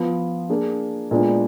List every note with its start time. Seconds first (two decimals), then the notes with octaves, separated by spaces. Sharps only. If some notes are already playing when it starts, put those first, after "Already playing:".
Already playing: F3 B3 F4
0.49 A#3 D4 G#4
1.11 A#2 G#3 B3 D4